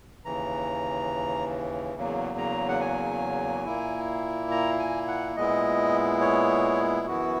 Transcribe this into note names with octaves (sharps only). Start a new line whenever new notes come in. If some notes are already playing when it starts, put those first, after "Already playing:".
D#2 C#3 E3 A#5
E2 C#3 F#3 A#3
A#5
F#5
G#5
A#2 A#3 E4
A#5
G#5
F#5
A#2 G#3 B3 E4 D#5
C#5
F#2 E3 B3 E4 F#4